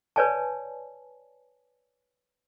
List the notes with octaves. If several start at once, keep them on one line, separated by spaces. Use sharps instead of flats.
B4 C#5 D5 G#5 A5